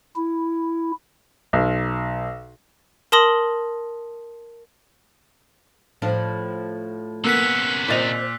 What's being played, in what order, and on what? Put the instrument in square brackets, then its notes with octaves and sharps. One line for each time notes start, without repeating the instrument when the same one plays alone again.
[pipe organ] E4
[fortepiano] B1
[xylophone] A#4 A5 C6 D#6 A#6 F#7
[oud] A2 F3 D4
[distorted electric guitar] C3 C#4 [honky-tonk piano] A#3 B3 [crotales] E6 F#6 B6
[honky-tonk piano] A#2 A6 F7 [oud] C4 D#5